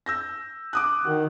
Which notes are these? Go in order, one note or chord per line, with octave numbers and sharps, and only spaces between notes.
E6 G6 A#6
D6 D#6 F#6
D#3 F#4